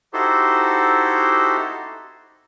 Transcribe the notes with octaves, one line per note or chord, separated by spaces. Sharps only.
D#4 E4 F#4 G4 A4 C5